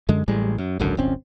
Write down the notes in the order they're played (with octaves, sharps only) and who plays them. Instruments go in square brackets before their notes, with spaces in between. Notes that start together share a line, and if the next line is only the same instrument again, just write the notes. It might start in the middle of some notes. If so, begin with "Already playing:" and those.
[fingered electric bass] F#2 D3 G#3
A1 A2 G3 G#3
F#2
G#1 C#2 F#2 D3
D1 G1 C4 C#4